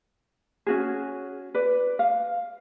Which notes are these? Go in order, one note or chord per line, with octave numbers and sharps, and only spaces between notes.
C#4 F#4 G#4
B4 D5
F5